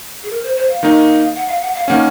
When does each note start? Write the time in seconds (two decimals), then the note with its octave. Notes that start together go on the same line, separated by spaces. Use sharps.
0.23 G#4
0.30 A#4
0.43 C5
0.57 C5
0.70 F5
0.83 D#3 A#3 D#4
1.35 F#5
1.48 F5
1.61 F#5
1.75 F5
1.88 D#3 A#3 C#4 F#5